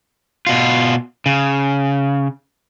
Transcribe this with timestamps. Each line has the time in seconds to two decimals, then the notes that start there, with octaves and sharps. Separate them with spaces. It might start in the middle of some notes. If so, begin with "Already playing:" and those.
0.47 B2 F4
1.26 C#3